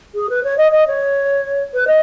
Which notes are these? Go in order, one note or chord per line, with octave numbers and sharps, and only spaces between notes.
G#4
B4
C#5
D#5
D#5
C#5
B4
D#5